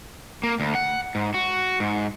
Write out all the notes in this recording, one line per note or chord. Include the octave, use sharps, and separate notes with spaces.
A#3
D2
F#5
G#2
F#4
G#2